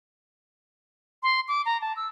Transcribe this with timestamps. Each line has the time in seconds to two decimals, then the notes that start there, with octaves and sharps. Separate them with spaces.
1.23 C6
1.48 D6
1.65 A#5
1.81 A5
1.96 E6